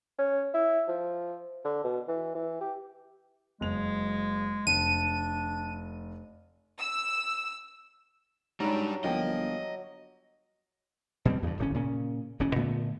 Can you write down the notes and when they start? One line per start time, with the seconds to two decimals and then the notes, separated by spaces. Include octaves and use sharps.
0.18 C#4
0.54 E4
0.88 F3
1.65 D3
1.84 B2
2.08 E3
2.35 E3
2.61 G4
3.61 F#1 G#3 F7
4.67 F1 D4 D#7
6.79 E6
8.60 G#2 F#3 G3 D4 A#5 B5
9.04 G1 F3 A#3 D#5 G5
11.25 B2 G3 C4
11.42 E2 G2
11.58 D1 G#1 C#4
11.74 A#2 C#3 C#4
12.40 E1 C#3 C#4
12.55 A#2 D3 A3 B3